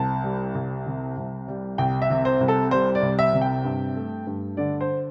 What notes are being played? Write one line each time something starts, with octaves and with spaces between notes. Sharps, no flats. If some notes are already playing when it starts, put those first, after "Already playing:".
Already playing: C2 A5
G3
C2
C3
C2
G3
C2 G5
E5
C3
C5
C2
A4
G3 C5
D5
C2
E5
C3
G5
G2
A3
G2
D3 D5
C5